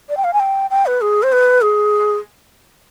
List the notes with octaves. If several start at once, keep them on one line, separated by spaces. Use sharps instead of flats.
D5
G5
F5
G#5
G5
G5
B4
G#4
C5
B4
G#4